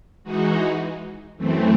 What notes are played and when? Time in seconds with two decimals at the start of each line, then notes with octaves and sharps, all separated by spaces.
0.24 E3 G#3 D#4 F#4
1.37 F#2 E3 A3 C4